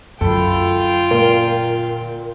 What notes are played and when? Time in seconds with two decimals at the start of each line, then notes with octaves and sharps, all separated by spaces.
0.21 F#2 D3 F4 A4 G5 B5
1.11 A#2 A#4